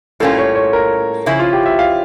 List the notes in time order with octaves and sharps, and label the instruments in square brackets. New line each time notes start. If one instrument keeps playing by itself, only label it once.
[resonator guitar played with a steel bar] A2 G3 A#3 C#4 F4 [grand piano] A4
[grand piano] C#5
C#5
A#4
[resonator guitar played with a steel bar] C#3 F3 C#4 E4
[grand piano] F4
G4
E5
F5